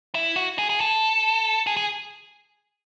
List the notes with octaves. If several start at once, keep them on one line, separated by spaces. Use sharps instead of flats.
E4
F#4
G#4
G#4
A4
G#4
G#4